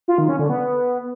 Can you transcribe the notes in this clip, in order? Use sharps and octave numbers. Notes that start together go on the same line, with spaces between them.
F4
D#3
C#4
D3
B3